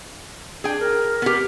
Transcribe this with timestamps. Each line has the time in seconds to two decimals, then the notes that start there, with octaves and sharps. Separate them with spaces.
0.64 D4 G#4 G5
0.79 A#4
1.22 B3 G4